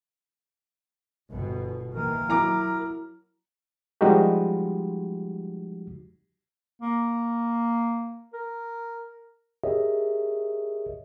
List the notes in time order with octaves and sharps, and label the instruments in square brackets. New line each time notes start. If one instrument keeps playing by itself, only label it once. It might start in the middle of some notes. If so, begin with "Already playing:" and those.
[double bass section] G1 B2
[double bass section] D#3 E3 A#3 [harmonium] A#4
[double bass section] F#3 [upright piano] E4 A#5 D6
[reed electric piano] F3 G3 G#3 D#4 F#4 G4
[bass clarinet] A#3
A#4
[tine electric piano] G4 G#4 A#4 C#5 D#5 E5